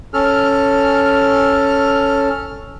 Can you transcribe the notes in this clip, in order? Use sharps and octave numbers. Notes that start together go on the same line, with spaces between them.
C#4 A4 F6